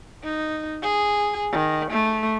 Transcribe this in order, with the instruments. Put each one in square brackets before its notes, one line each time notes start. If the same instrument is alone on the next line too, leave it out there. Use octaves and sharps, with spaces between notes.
[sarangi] D#4
G#4
D#3
A3